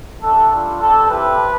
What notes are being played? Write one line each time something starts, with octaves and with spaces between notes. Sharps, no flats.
A3 D4 G4 A4
G3 D4 F4
G3 C4 G4 A4
C4 E4 G4 B4